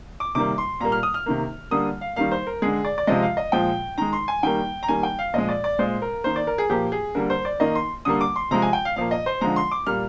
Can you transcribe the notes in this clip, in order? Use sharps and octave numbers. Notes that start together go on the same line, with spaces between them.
D6
C3 D#3 G3 A#3 D6
C6
A#2 G3 A#3 A#5
F6
D#6
F6
C3 D#3 A#3
D3 G3 A#3 D#6
F5
D#3 G3 A#3 F5
C5
A#4
D3 G#3 G#4
D5
D5
C3 F3 G#3 D#5
F5
D#5
A#2 F3 G#3 G5
D#3 G#3 A#5
C6
G#5
D#3 G3 A#3 G5
A#5
D#3 G3 A#3 G#5
G5
F5
A#2 F3 G#3 D#5
D5
D5
A#2 G#3 C5
A#4
D#3 A#3 C5
D5
A#4
G#4
A#2 F3 A#3 G4
G#4
D3 G3 A#3 A#4
C5
D5
D#3 A#3 D#5
C6
D3 G3 A#3 D#6
D6
C6
C3 F3 G#3 A#5
G#5
G5
F5
A#2 F3 A#3 F5
D#5
C5
D3 F3 G#3 A#5
C6
D6
A#2 G3 A#3 F6